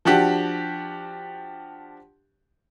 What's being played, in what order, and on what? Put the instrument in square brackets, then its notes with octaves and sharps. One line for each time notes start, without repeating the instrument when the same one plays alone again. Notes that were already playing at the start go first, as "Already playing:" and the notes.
[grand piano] F3 D4 F#4 G4